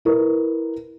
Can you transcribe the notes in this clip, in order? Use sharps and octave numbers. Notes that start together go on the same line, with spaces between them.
E4 A#4 B4